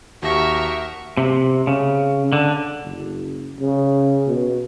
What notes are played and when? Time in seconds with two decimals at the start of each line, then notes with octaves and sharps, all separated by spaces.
0.23 D#2 F#4 G4 A#4 E5 C#6 A#6
1.17 C3
1.67 C#3
2.33 D3
2.83 F#1
3.60 C#3
4.27 B2